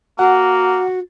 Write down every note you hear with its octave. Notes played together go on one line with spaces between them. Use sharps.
A#3 F#4 F#5